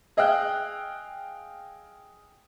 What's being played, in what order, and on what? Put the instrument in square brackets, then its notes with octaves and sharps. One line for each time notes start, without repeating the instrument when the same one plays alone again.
[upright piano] G#4 D#5 F5 G5 E6 F#6